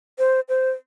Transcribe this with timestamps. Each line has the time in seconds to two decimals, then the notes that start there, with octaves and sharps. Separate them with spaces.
0.19 C5
0.49 C5